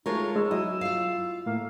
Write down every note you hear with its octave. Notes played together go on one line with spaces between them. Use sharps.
G#3 A3 D#4 F4 A#4 C#5 A5
G#3 D#4 C#5 E6
F#3 E4 D#5
F4 F5
A2 A#3 F5